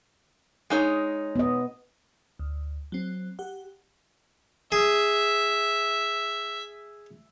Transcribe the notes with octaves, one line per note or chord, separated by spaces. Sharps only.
G#3 D#4 C#5
B3 D#5
D2
F#3 C4
G4 F#5
G#4 E5